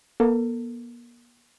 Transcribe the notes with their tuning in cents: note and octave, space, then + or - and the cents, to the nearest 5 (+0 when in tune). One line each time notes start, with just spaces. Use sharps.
A#3 +45 A4 +35